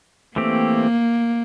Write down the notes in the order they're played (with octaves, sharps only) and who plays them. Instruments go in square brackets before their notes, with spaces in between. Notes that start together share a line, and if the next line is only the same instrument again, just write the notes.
[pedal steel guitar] E3 A3 C4 G4 [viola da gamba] A#3